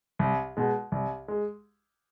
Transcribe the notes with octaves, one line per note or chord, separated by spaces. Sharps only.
C2
B2 G#3
C2
G#3